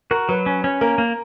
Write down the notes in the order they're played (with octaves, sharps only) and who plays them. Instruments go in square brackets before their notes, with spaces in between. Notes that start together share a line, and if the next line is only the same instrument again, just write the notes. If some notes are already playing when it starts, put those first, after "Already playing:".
[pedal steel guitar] F#4 [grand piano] A#4
[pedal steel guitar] F#3 [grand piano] B4
[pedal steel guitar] C#4
C#4
[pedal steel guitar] A#3 [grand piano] A#4
[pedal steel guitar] A#3